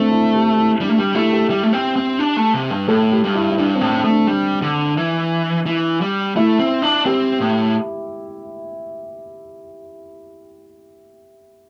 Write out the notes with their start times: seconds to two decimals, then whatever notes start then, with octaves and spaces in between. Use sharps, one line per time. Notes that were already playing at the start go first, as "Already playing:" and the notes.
Already playing: A3 C4 D4 E4
0.11 E4
0.34 G4
0.57 E4
0.80 G3 D4
0.89 A3
0.98 G3 G4
1.15 A3 E4
1.32 G4
1.50 G3
1.63 A3
1.73 C4
1.96 C4
2.19 D4
2.37 A3
2.54 C3
2.71 G2
2.88 A2 A4
3.12 G4
3.24 G2
3.35 E4
3.51 E4
3.58 G2 D4
3.75 C4
3.81 A2
3.93 D4
4.04 A3
4.10 D4
4.27 G3 D4
4.62 D3
4.97 E3
5.66 E3
6.01 G3
6.36 A3 E4
6.59 C4
6.82 D4
7.05 C4 G4
7.40 A2